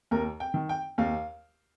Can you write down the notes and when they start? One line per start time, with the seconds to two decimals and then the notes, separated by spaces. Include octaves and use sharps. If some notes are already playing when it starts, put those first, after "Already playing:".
0.11 D#2 A#4
0.40 G5
0.54 D#3
0.69 G5
0.98 D#2 F5